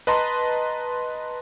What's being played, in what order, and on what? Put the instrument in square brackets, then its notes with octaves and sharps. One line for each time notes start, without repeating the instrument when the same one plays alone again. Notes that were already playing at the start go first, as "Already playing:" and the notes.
[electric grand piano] B4 D#5 A5 A#5 C6